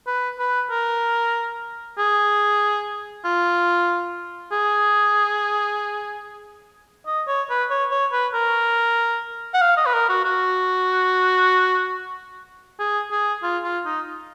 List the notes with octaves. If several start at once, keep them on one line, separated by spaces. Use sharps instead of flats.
B4
B4
A#4
G#4
F4
G#4
D#5
C#5
B4
C#5
C#5
B4
A#4
F#5
F5
D#5
B4
A#4
F#4
F#4
G#4
G#4
F4
F4
D#4